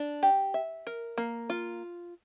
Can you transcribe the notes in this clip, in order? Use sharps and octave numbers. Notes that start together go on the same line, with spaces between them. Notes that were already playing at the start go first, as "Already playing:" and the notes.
Already playing: D4
G4
E5
A#4
A#3
F4